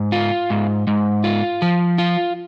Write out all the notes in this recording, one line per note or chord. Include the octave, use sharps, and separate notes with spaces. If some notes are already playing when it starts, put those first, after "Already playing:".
Already playing: G#2
F4
G#2
G#2
F4
F3
F4